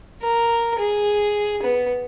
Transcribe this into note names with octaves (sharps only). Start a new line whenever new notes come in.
A#4
G#4
B3